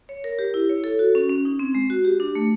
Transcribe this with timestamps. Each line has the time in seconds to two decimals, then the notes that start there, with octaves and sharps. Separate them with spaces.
0.09 C#5
0.24 A#4
0.39 G4
0.54 E4
0.69 C#5
0.84 A4
0.99 F#4
1.15 C#4
1.29 C#4
1.45 D#4
1.59 C4
1.75 G#3
1.90 F#4
2.04 G4
2.20 D4
2.35 A3